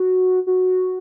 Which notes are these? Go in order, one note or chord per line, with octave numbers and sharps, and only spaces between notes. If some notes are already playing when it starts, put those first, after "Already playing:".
Already playing: F#4
F#4